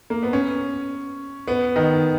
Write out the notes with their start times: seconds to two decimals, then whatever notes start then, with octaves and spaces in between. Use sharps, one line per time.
0.10 A#3
0.23 B3
0.33 C#4
1.48 B3
1.76 D#3